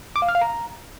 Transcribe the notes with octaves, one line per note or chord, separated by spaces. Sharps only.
D6
F5
F6
F5
A#5